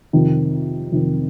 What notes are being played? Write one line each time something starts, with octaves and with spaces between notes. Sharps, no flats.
F2 C3 D#3
F2 C3 D#3